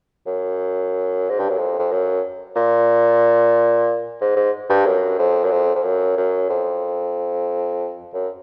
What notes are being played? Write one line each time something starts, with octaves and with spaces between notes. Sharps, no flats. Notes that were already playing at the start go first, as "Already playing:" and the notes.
F#2
G#2
G2
F#2
F2
F2
F#2
A#2
G#2
G#2
G2
F#2
F2
F#2
F2
F2
F#2
F#2
F2
F#2